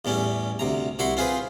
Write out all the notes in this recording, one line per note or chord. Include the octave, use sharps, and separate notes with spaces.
E2 A2 G3 C#4
D2 C3 A#5
C2 E4 F#4 F#5 C6
C4 F4 G#4 B4 C5